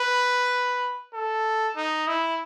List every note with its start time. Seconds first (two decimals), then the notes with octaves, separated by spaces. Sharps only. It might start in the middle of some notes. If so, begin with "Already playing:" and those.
Already playing: B4
1.14 A4
1.77 D#4
2.08 E4